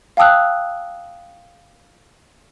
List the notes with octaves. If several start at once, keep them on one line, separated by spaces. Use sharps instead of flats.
F5 G5 A5 D#6 E6 F#6